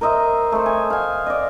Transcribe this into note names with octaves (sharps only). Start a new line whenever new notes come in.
A#4 C5 D#5 E5
A3 C5
G#5
F5 G#5
D5 D#5